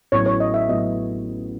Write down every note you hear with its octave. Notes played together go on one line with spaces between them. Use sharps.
A1 A2 F#3 B3 C#5
C#5
D#5
E5
A2 F#3 B3 D#5